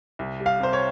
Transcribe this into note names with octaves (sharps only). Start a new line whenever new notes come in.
C2
G3
F5
C3 C5
C#5